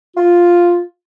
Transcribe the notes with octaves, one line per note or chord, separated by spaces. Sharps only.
F4